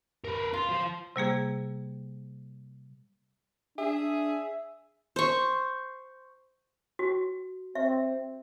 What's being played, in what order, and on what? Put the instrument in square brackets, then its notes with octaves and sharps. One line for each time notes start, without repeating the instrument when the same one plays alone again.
[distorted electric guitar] A#4 B4
[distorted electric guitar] F4 [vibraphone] C6
[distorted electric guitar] F4 C5
[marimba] C3 G3 A#3 G#4
[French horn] D4 [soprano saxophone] G#4 [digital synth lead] E5
[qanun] C5 C#6
[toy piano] F#4
[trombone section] C4 [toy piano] E5